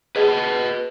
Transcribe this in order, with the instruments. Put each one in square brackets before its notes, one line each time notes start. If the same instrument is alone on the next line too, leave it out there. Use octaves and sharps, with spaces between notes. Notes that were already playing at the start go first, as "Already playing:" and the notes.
[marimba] G#4 [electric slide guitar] B4 D#5 A5